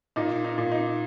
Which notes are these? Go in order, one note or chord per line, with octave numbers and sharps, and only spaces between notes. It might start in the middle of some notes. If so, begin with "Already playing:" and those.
A#2 D#4
D#4
A#2
D#4